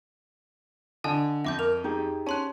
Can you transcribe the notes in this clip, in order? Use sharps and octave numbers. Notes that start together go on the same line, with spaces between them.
D3 D#5 G#5 A5
F2 E5 D6 G6
A#4 F7
D#4 G4 G#4
C#4 A5 C6 F#6